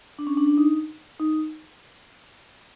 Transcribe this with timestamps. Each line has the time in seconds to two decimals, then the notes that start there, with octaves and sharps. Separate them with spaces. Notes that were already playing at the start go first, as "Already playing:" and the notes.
0.19 D4
0.27 C#4
0.37 D4
0.48 D4
0.58 D#4
1.19 D#4